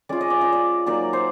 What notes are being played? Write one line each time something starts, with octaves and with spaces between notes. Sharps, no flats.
G#3 C#4 F4 D5
D#5
D5
D#5
D5
F#3 A#3 D#4 D5
C5